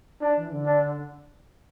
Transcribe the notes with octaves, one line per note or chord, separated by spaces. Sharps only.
D4
E3
D3
D4